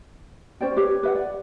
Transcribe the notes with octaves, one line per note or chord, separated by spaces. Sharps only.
C#4 C5 D5 G5
G4 B4 C#5
B4 E5 F#5
D5